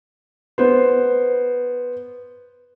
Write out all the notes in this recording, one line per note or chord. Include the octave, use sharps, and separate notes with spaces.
B3 C5